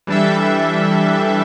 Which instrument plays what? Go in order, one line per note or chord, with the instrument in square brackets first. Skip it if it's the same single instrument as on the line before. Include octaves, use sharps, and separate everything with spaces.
[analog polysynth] E3 G3 D4 A4 E5